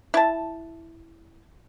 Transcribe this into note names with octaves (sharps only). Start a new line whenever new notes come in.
E4 A5